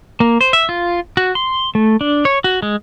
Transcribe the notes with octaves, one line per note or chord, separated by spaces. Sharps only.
A#3
C5
E5
F4
F#4
C6
A3
D4
C#5
F#4
G#3